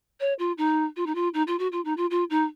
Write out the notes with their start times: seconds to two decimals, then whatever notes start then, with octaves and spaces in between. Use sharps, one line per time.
0.20 C#5
0.39 F4
0.58 D#4
0.96 F4
1.07 D#4
1.15 F4
1.34 D#4
1.47 F4
1.59 F#4
1.72 F4
1.85 D#4
1.97 F4
2.11 F4
2.30 D#4